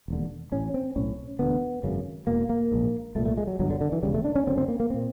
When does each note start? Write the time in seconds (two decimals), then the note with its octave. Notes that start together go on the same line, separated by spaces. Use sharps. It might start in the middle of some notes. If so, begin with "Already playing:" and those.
0.08 E1 D#2 D3
0.52 A1 A2 C#4
0.74 C4
0.96 B1 A2 C#4
1.39 E1 D2 D3 B3
1.83 G#1 F#2 C#3
2.27 E1 E2 B2 A#3
2.49 A#3
2.72 A#1 G#2
3.15 C2 A#2 A3
3.25 A3
3.37 G#3
3.47 F#3
3.59 G1 G2 D3 F#3
3.70 D3
3.81 D3
3.92 E3
4.03 E1 D#2 C#3 G3
4.14 A3
4.25 D4
4.35 C#4
4.46 F#1 F#2 D3 C4
4.58 C4
4.68 A#3
4.80 A#3
4.90 A#2 C4